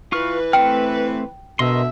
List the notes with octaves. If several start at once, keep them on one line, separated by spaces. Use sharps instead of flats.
E3 F4 B4 C#6 F6
A3 C4 G5 F6
B2 D3 A#4 D#5 E5 C6